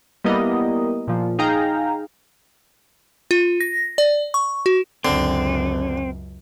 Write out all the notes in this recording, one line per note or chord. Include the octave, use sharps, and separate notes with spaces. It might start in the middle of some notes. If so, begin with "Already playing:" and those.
G3 A#3 B3 E4 A#4 D#5
A#2 F3
D#4 G#4 F5 G5 A#5
F4
A#6
D5
C#6
F#4
C#2 F#2 D3 C4